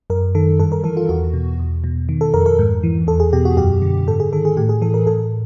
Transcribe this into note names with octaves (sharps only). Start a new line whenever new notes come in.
F#2 A#4
D#3 A4
G2 A4
A#4
E3 A4
F4
E2 F#4
B2
E2
B2
D#3
A4
F2 A#4
A#4
G#2
E3
E2 A4
G#4
B2 G4
F#4
F#2 G4
D3
G#2 A4
G#4
D#3 A4
G#4
A2 G4
G#4
E3 A4
A#4
A2 A4